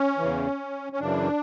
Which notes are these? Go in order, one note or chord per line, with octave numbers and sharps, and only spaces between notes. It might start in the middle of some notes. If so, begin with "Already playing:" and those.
Already playing: C#4
E2 C#3 E3
C#4
F#2 C#3 E3 D4